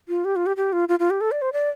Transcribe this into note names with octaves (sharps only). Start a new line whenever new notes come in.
F4
G4
F4
G4
G4
F4
F4
F4
G4
A4
D5
C5
D5